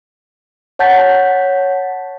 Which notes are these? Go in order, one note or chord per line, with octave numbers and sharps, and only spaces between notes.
C#5 F#5 A5 G6 A6 B6